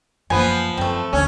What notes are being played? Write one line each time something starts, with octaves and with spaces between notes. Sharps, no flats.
F#2 F3 A#3 B3 G#5
F#2 A3 C4
D2 C#4